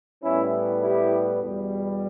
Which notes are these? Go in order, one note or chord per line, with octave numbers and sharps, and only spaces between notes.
A2 G3 B3 C#4 E4
E4 G4
E2 B2 G3